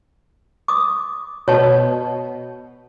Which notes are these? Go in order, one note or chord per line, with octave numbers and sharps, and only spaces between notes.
D6 D#6
B2 C#5 A5